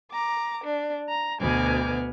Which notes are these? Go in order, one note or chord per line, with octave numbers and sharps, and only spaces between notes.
A#5 D6
D4
A#5
D2 B2 B3 G#5 D6 F6